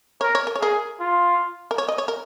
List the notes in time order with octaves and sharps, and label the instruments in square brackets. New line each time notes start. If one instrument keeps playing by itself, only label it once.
[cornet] A#4 [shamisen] C#5
[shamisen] C#5
A#4
C#5
[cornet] G#4 [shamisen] A#4
[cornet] F4
[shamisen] A#4
C#5
D#5
C#5
A#4